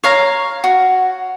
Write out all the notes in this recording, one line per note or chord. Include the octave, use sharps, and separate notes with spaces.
C#5 F5 A#5
F#4